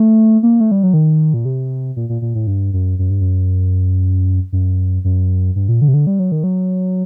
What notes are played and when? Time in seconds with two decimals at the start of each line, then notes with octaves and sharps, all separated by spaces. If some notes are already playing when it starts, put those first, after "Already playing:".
Already playing: A3
0.43 A#3
0.60 A3
0.71 G3
0.83 F#3
0.94 D#3
1.34 A#2
1.45 C3
1.96 A#2
2.09 A#2
2.22 A#2
2.35 A2
2.47 G2
2.73 F#2
2.99 F#2
3.10 G2
3.21 F#2
4.53 F#2
5.05 F#2
5.56 G2
5.68 A#2
5.81 D3
5.88 C3
5.94 D3
6.07 G3
6.19 F#3
6.32 D#3
6.44 F#3